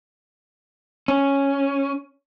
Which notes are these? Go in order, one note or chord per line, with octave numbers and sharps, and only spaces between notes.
C#4